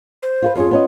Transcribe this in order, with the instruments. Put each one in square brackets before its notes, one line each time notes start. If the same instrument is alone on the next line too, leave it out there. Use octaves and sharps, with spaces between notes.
[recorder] C5
[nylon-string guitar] F4 F#4 B4
[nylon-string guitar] F2 C#4 G#4 [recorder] F4
[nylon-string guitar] B3 C#4 D#5